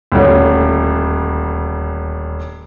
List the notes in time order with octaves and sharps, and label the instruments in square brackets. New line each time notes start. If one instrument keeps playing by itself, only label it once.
[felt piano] D#1 D2